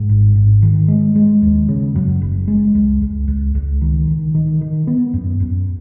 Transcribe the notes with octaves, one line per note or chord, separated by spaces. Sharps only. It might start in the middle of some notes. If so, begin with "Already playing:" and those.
Already playing: G#2
G#1
G#2
D#3
G#3
G#3
D#2
C#3
F#2
F#1
G#3
C#2
C#2
C#2
C#2
D#3
D#3
D#3
D#3
B3
F#2
F#2